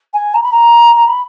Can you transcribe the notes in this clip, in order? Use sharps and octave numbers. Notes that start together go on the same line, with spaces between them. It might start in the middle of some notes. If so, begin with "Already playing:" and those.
G#5
A#5
B5
A#5
A#5
B5